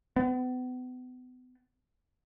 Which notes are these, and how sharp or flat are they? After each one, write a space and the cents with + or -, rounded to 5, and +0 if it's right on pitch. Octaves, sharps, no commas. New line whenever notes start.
B3 +35